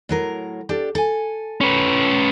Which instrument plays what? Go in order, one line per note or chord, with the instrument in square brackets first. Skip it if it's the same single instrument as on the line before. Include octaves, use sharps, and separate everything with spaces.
[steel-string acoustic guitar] A2 F#3 A#4
D4 G4 A4
A4 G#5
[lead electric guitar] C#4 B4